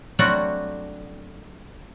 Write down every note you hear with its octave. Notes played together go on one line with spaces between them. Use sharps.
F#3 G3 A3 C4 D4 F#4